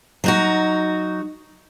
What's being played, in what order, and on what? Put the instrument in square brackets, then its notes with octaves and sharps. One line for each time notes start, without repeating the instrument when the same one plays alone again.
[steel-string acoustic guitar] F#3 D#4 F#4